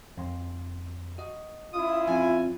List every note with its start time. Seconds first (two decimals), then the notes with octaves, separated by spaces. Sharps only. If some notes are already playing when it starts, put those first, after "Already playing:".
0.17 F2 C6
1.18 F#4 D#5
1.73 C#4 E4 F4 D#6
2.07 F2 G#5